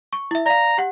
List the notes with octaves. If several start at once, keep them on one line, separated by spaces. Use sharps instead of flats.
C#6
E4 E5
D5 F5 A#5
G4 F#5